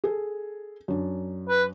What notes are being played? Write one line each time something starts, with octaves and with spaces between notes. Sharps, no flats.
G#4 A4
F#2 D4
B4